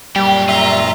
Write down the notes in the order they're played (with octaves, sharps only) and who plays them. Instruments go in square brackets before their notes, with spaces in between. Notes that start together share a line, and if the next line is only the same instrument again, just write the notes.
[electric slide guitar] F#2 A#2 G5 [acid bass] G3 [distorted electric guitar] G4
[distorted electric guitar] F4 [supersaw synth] E5 A#5